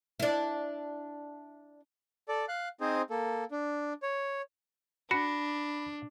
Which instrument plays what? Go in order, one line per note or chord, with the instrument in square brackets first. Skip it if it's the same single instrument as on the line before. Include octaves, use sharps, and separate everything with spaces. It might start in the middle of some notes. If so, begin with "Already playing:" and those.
[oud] D4 E4
[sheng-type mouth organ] A4 D5
F5 F#6
C4 D#4 G#4 C5
A#3 A4
D4
C#5
[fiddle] D4 [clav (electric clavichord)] F#4 [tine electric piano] B5 A#6